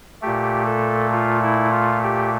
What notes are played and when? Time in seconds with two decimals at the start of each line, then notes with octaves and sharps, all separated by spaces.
0.22 A#2 A3 G4
0.67 A4
1.12 F4
1.43 E4
1.72 F4
2.03 G4